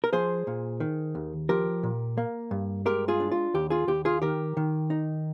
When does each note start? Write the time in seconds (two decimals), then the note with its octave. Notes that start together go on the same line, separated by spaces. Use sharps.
0.04 A#4
0.13 F3 G#4 C5
0.47 A#2
0.80 D#3
1.15 D#2
1.49 F3 G4 A#4
1.83 A#2
2.18 A#3
2.51 G2
2.86 G#3 G4 A#4
3.08 F4 G#4
3.20 D4
3.32 F4
3.54 D#2 G4
3.70 F4 G#4
3.88 D#2 G4
4.05 F4 G#4
4.22 D#3 G4 A#4
4.57 D#3
4.90 D#4